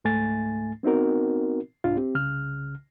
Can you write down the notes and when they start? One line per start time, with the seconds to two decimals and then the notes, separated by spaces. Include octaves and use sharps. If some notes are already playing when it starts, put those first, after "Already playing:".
0.04 C#2 G#2 A3 G#5 A6
0.83 B3 C4 D#4 F#4 A#4
1.84 C2 G#2 D4 F4
1.97 C4 G4
2.15 C2 C#3 F6